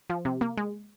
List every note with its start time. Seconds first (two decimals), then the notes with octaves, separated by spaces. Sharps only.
0.10 F3
0.25 C3
0.41 A#3
0.57 G#3